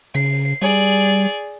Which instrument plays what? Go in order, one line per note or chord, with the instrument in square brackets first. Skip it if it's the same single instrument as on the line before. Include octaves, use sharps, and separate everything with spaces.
[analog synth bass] C#3 [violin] C7
[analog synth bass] G3 [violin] G#4 D5